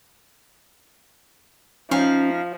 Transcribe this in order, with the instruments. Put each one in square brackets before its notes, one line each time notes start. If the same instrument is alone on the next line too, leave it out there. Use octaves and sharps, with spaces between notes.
[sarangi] F3 [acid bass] C#4 [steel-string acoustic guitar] D#4 E5 F5